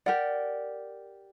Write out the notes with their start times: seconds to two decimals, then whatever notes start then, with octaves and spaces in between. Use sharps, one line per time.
0.06 G4 A#4 D5 F#5